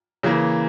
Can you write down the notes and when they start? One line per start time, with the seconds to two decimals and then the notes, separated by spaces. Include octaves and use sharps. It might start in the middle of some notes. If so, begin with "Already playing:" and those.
0.23 C#3 E3 A#3